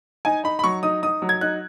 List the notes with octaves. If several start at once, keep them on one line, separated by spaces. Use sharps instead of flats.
D#4 G#5
D#4 B5
B5
F#3 C#6
D#4 D#6
D#4 D#6
F#3
G#6
D#4 F#6